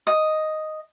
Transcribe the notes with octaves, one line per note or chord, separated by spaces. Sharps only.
D#5